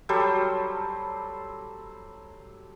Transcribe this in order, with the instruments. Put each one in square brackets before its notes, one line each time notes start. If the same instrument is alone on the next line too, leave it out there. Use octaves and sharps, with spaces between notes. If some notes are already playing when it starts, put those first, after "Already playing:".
[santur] F#3 G3 A4 C5